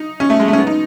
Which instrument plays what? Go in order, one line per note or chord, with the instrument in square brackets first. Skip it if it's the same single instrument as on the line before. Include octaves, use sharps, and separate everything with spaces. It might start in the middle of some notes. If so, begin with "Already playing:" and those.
Already playing: [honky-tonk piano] D#4
C#4
A3
G#3
A3
C#4
B3
D#4